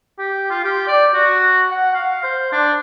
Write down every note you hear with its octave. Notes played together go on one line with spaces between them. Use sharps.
G4
F4
G4
D5
F#4
F#5
F5
C5
D4